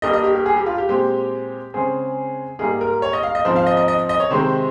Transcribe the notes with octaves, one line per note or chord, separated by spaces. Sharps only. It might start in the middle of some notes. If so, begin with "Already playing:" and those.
G2 G3 A#3 D#5
D#5
G4
G4
G#4
G4
F4
G4
A#2 G#3 C4 G4
C#3 G#3 C4 G#4
G#2 G3 A#3 G#4
A#4
C#5
D#5
F5
D#5
G#2 F3 C4 C5
F5
D#5
D#5
D#5
D#5
C#5
C3 D#3 G#3 C4 C5